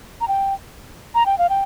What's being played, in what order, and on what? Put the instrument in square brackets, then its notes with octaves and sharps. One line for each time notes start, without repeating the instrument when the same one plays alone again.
[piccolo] A#5
G5
A#5
G5
F5
G5